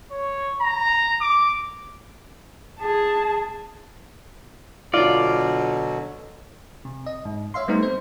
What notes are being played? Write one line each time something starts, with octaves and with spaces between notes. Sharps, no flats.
C#5
A#5
D6
G#4 A5
B2 D3 F#3 F4 D5
C3
D#5
G#2
C#5 E5 F5 C6
G3 A3 B3 C4 D#4
C5